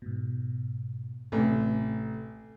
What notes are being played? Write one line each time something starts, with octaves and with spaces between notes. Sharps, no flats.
G#2 B2
A1 C3